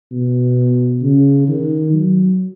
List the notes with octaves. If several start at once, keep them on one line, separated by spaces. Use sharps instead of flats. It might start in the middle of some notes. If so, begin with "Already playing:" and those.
B2
C#3
D#3
F#3